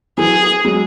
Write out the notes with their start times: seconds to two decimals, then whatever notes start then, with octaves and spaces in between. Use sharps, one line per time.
0.18 E3 F#3 G#4
0.65 F#3 G#3